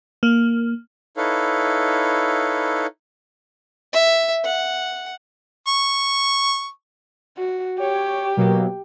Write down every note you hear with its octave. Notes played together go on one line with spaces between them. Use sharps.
A#3
D#4 E4 A4 B4 C#5 F5
E5
F#5
C#6
F#4
G4 C#5
B2 F#3 A#3